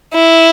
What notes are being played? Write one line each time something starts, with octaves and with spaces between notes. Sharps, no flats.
E4